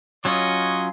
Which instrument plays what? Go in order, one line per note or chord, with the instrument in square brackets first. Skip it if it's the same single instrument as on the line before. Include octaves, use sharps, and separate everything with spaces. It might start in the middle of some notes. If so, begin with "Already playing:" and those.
[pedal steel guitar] F#3 C#4 F4 [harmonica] D#5 C#6